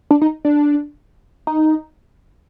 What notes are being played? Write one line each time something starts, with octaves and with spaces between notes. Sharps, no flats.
D4
D#4
D4
D#4